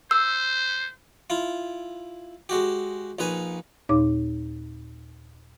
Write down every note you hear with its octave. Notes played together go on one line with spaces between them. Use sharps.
C5 E6
E4 F4
G#3 F#4 G4
A#1 D#4 B4 G#5
D#2 A#2 D#4 C#5 D6